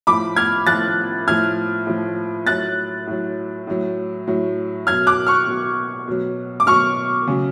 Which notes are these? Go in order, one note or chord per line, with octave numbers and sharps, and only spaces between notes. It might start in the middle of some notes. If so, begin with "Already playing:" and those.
A2 F3 B5 D6
F6 G#6
A2 F3 F#6 A6
A2 F3 F6 G#6
A2 F3
A2 F#3 F#6 A6
A2 F#3
A2 F#3
A2 F#3
B2 F#3 F6 G#6
D6 F#6
C#6 F6
B2 F#3
B2 F#3
D6
B2 F#3 C#6 F6
C#3 F#3